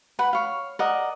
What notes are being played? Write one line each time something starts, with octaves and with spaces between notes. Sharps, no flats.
B4 F#5 B5
C#5 F5
A#4 D5 D#5 F#5